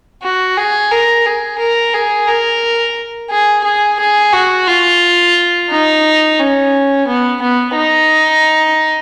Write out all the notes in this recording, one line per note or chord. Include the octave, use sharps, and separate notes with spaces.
F#4
G#4
A#4
G#4
A#4
G#4
A#4
G#4
G#4
G#4
F#4
F4
D#4
C#4
B3
B3
D#4